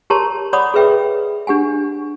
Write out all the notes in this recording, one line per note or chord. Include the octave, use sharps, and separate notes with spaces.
G4 A#4 C#5 A5 A#5 C6
C#5 D5 F#5 B5 D6 D#6
G#4 A4 B4 E5 G5
D4 G4 F#5 G#5